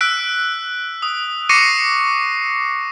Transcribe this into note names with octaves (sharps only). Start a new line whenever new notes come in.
E6 F#6 B6 D7
D#6
C#6 D6 A#6 C7 C#7 D#7